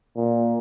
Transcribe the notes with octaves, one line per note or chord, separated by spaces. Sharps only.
A#2